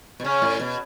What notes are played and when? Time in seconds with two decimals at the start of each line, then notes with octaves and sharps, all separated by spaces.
0.20 B2
0.25 C#3 C#4
0.42 A2
0.59 B2